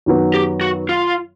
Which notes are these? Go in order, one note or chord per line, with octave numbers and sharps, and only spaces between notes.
F#2 D#3 F#3 B3
G4
F#4
F4